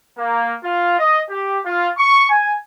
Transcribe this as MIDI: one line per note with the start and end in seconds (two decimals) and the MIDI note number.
0.17 0.54 58
0.62 0.95 65
0.98 1.20 75
1.29 1.59 67
1.64 1.89 65
1.97 2.28 85
2.29 2.54 80